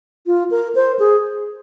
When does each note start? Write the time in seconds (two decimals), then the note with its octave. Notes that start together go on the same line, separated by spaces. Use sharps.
0.27 F4
0.51 A#4
0.75 C5
0.99 G#4